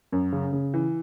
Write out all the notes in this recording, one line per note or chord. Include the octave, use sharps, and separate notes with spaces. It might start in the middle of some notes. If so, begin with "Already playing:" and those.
F#2
C#3
C#3
E3